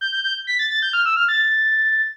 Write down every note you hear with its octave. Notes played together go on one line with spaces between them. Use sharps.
G6
G6
G6
B6
A6
A6
G6
F6
E6
F6
A6